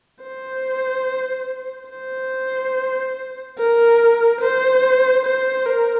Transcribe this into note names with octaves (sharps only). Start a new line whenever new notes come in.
C5
C5
A#4
C5
C5
A#4